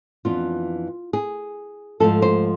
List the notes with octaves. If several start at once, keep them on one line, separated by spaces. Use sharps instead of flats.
F2 E3 B3 D4 F4
G#4
G#2 F3 A3 A4
C5